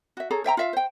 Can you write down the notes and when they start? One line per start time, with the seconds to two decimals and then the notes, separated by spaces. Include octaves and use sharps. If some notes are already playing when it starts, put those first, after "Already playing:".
0.17 F#4 E5
0.31 G#4 A4 C#5 A#5
0.44 C5 E5 G5 A#5
0.57 F4 E5 F5
0.73 C5 G5